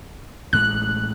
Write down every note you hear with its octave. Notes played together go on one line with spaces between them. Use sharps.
A1 A2 G#3 F#6